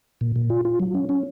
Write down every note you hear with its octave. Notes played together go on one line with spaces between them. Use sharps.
A#2
A#2
F4
F4
F#3
C#4
C#4